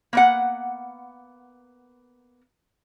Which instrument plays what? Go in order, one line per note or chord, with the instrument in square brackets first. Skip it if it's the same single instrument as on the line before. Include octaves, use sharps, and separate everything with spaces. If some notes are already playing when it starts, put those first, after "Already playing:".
[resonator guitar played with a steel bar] A#3 B3 F#5